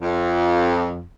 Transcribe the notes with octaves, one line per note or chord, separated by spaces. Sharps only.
F2